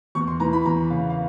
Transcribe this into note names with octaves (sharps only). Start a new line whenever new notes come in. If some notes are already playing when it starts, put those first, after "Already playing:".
E2 C#6
C6
E3 A#5
B5
E2 A#5
C#3 F5
F5